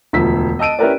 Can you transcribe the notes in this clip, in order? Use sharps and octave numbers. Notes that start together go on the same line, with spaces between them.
E1 D2 F3 E6 B6
D#5 A5 E6 D7 D#7
C#4 E4 G4 A#4 B4 D5